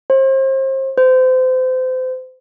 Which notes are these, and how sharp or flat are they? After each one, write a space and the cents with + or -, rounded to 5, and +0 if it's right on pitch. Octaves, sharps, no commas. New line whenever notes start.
C5 +35
C5 -30